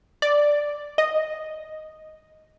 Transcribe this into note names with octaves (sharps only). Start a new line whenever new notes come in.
D5
D#5